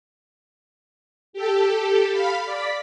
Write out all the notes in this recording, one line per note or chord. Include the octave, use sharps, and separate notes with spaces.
G4 A4
F5 B5
D5 B6